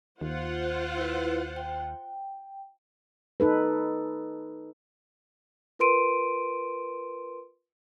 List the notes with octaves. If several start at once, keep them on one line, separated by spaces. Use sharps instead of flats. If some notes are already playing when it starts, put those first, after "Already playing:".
D#2 F4 C5 F#5
E4 B4
G5
D#4 A4 B4
F4 A#4 B4 C6 D7 D#7